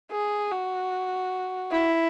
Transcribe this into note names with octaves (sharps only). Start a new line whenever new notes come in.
G#4
F#4
E4